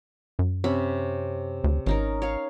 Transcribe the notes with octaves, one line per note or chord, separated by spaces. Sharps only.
F#2
C3 C#4 B5
D2
G#1 C#4 D#4 A#4
C#5 F5